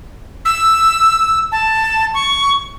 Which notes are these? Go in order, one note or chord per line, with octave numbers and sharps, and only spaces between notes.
E6
A5
C#6